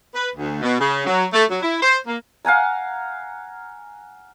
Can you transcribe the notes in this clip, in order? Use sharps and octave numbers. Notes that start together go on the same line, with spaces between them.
B4
D2
B2
C#3
F#3
A3
F#3
E4
C5
A#3
F5 F#5 G#5 A#5